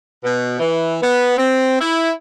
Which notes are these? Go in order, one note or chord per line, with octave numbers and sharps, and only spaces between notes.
B2
E3
B3
C4
E4